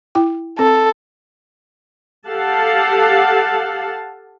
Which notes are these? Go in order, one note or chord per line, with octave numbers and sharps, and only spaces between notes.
E4 G5
C4 A4
G4 A4 F5 F#5 A5